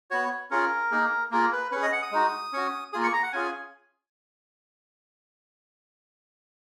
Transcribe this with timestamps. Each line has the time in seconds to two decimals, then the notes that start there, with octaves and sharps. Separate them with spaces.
0.11 B3 F#4 C#5
0.51 C#4 F4 G#4 A#4
0.91 A#3 D#4 G#4
1.31 A#3 F4 G#4 A#4
1.52 B4
1.71 C#4 G#4 B4
1.82 D#5
1.92 F#5
2.02 D#6
2.12 G#3 D#4 F#4
2.53 C#4 F#4
2.93 A#3 F4 G#4 D#6
3.03 C#6
3.13 A#5
3.23 F#5
3.33 C#4 F4 G#4 G#5